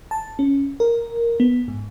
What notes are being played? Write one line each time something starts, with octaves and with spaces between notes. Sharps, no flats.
A5
C#4
A#4
B3
G#2